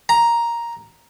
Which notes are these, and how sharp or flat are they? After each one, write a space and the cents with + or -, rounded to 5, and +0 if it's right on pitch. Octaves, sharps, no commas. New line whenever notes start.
A#5 +5